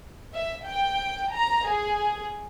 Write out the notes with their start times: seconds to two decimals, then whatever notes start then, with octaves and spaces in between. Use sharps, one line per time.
0.33 E5
0.65 G5
1.33 A#5
1.66 G#4